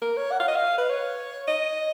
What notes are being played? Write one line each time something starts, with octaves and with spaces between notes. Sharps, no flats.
A#4
C#5
F#5
F5
D#5
F5
B4
C#5
D#5